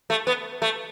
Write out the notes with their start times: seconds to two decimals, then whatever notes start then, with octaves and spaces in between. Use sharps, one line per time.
0.10 A3
0.27 B3
0.62 A3